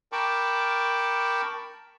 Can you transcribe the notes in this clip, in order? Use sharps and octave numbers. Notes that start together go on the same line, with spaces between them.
A#4 G5 A5 B5 C#6 D6